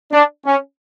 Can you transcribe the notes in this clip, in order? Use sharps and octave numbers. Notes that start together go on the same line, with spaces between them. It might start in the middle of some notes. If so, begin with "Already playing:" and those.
D4
C#4